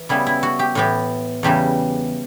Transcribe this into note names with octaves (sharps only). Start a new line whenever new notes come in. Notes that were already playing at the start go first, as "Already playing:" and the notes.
Already playing: E3
C#3 G3 B3 E4
E4
F#4
G4
A2 E3 B3 G4
E2 C#3 E3 G3 G4